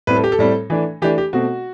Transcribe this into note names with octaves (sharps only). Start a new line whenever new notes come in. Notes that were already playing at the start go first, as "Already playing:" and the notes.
A2 G3 C4 B4
A4
G4
A4
A2 G3 C4
E3 A3 D4
E3 A3 D4 G4
G4
B2 A3 C4 F#4